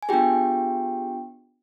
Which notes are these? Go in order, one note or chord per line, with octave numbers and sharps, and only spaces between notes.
G#5
B3 D4 F4 G4 G#4 G5